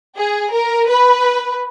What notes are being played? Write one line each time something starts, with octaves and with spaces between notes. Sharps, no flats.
G#4
A#4
B4